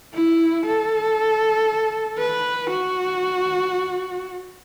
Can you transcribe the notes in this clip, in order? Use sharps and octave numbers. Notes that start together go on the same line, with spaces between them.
E4
A4
B4
F#4